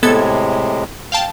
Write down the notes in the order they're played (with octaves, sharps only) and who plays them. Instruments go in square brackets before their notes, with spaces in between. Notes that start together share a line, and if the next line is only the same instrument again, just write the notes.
[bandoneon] A2 C3 G#3 [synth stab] B3 A4 G#6
[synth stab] F5 G5 A5